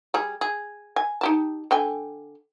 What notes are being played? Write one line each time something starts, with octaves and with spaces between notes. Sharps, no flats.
G3 G#4
G#4
G#5
D#4 G4 A5
D3 G5 G#5